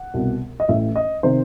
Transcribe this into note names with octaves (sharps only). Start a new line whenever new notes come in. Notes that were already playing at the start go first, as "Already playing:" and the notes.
Already playing: F#5
C2 B2
D#5
A1 A2 E3 E5
D#5
C3 D#3 C5